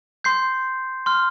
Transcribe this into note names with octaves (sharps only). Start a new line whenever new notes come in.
C6 G6 C7
C6 F6